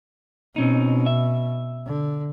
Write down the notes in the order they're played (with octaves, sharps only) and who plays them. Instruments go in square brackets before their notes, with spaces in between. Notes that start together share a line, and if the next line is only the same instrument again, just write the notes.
[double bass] B2 [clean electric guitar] C4 C#4 D#4
[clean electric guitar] E5
[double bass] D3